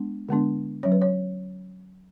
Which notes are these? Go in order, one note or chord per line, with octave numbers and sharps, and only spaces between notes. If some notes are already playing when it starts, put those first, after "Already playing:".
Already playing: G#3 B3 D4
D3 G#3 B3 D4
F#3 C#4 C#5
B4
C#5